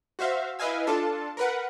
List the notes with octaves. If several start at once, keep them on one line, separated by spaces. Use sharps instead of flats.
F#4 C5 E5 F5
E4 B4 D#5 F5 G#5 E6
D4 F4 A4 A5
A#4 B4 F#5